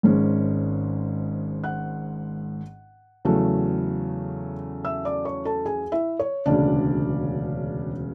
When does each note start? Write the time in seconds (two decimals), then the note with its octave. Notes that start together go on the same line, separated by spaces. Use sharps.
0.03 G#1 G#2 G#3 C#4
1.64 F#5 F#6
3.25 E2 C#3 F#3 A3
4.85 E5 E6
5.05 D5 D6
5.25 C#5 C#6
5.45 A4 A5
5.66 G#4 G#5
5.92 E4 E5
6.19 C#5
6.46 E1 D2 C#3 D4 D5